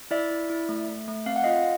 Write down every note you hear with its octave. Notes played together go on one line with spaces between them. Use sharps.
E4 D5 E5
E4
E4
A3
A3
A3
C4 F5
F#5
F4 D#5 F5